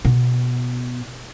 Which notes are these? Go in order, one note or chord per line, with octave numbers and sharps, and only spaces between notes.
B2